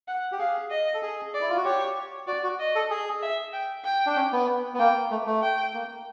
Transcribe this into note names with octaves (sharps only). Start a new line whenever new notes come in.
F#5
G4
G#4 F5
D#5
A4
G#4
D5
E4
F4
F#4
G4 C#5
F#4 D5
F#4
D#5
A4
G#4
E5
G5
G5
D4
C#4
B3
B3
A#3 G5
A3
A3
G5
A#3